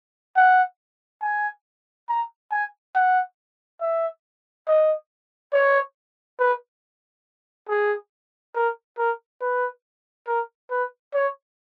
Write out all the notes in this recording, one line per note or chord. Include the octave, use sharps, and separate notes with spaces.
F#5
G#5
A#5
G#5
F#5
E5
D#5
C#5
B4
G#4
A#4
A#4
B4
A#4
B4
C#5